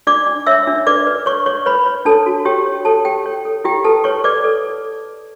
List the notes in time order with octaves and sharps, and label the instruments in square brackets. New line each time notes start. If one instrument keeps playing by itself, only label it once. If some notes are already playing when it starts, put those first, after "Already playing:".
[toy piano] D4 D5 D6
D4
C#5 E5 E6
D4
B4 D5 D6
B4
C#5 C#6
C#5 C#6
B4 C#5 B5
C#5
D4 A4 A5
F#4
G4 C#5 G5
C#5
A4 C#5 A5
G4 C#5 G5
C#5
A4
E4 G4 G5
A4 B4 A5
B4 C#5 C#6
B4 D5 D6
A4